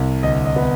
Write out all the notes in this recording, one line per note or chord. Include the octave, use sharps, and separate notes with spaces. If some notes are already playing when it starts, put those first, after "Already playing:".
Already playing: C2
D2 D#5
D#5
B3